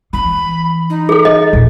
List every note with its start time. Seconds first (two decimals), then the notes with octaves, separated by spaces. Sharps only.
0.13 E3 B5
0.90 D#4
1.09 G#4 A4
1.25 D#5
1.53 D#2 A#2